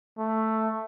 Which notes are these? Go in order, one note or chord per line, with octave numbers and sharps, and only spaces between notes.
A3